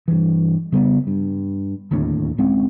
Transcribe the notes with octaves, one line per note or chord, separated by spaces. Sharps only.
G2 E3
C#3 G3 A#3 B3
G2
D1 D#2 A2 D3
D1 G#3 C4 C#4